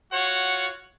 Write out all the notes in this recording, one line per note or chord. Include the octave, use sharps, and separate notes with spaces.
F4 F#4 C#5 F#5